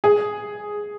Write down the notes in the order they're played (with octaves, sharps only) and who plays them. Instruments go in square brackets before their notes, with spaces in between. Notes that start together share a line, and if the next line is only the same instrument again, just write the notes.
[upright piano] G#4